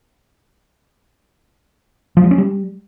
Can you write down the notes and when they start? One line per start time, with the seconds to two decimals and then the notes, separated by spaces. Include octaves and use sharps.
2.17 F3
2.24 G3
2.31 C#4
2.38 G3